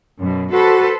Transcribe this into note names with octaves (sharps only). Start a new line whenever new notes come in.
F#2 B2
F#4 A4 B4 C5